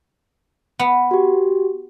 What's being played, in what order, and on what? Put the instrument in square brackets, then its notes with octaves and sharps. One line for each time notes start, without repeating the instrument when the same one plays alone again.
[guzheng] B3
[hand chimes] F#4 G4